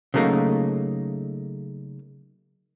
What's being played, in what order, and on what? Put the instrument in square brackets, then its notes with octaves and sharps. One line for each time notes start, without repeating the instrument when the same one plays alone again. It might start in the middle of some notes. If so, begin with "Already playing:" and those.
[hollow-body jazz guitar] C#3 F#3 A3 A#3 D#4